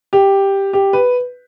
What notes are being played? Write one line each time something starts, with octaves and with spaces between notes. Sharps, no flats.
G4
G4
B4